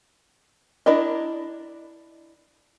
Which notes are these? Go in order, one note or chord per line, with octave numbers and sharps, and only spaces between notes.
D4 E4 A#4 D5 D#5